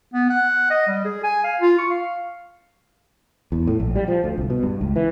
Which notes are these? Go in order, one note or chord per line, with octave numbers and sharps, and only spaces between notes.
B3
F#5
D#5
G3
G#4
G#5
F5
F4
C#6
F5
E2
A2
A#1
G3
F3
D2
C2
B2
G2
C#2
E3